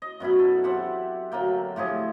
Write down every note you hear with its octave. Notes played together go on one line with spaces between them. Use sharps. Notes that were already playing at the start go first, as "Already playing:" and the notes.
D#5
F#2 B2 E4 B5
A4
C4 G4 F#5
D3 F#3 A#3 G5
A2 F3 G4 G#4